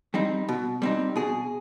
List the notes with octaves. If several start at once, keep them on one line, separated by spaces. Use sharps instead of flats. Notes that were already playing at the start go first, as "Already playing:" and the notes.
G3 C4 D#4
B2
G3 C4 D#4
B2 G#4